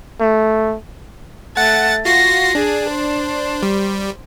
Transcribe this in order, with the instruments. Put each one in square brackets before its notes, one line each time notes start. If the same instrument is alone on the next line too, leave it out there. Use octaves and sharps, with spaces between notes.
[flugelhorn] A3
[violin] A3 A6 [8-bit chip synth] F#5
[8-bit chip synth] F4 F#4 C7 [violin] A#6
[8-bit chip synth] D4 [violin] G#4
[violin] C5
[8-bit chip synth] G3